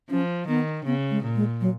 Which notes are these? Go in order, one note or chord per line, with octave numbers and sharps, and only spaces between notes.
F3 C#4
D#3 B3
C#3 B3
G#3
A#2
G#3
F#3